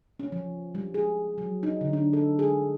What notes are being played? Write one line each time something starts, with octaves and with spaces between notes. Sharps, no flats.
C#4
F3
G3
G#4
F#3
D#4
D3
D4
A4
G#4